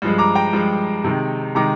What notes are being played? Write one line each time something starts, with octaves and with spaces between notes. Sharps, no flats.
G2 F3 G#3
A#5 D6
G5 A#5
G2 F3 G#3
C3 D#3 G#3
C3 D#3 G#3 A#5 D6